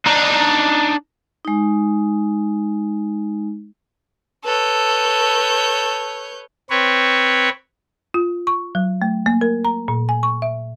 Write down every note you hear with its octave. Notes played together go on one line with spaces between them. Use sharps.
D4 D#4
G#3 D#4
A4 B4 C#5 G6
C4 B4 C#5
F4
C#6
F#3
A3
A#3
A#4
A#5
A#2
G#5
C#6
E5